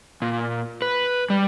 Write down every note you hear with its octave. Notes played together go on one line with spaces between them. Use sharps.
A#2
B4
G3